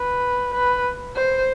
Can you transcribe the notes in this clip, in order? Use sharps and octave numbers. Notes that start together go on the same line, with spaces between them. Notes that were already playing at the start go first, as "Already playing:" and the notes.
Already playing: B4
B4
C5